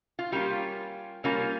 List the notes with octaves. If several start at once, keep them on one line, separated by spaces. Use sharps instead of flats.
F4
G3 A#3 C#4 F4 G4
G3 A#3 C#4 F4